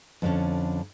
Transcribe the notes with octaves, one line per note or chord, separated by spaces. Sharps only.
F2 D3 C#4